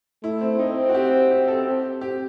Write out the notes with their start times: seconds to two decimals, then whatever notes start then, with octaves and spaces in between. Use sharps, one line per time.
0.23 A3 E4
0.41 C4
0.59 C4 D#4
0.89 F#4
0.94 G4
1.31 G4
1.48 A4
1.67 C4 G4
2.01 G4